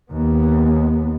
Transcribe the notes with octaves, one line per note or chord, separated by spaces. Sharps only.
D#2 B3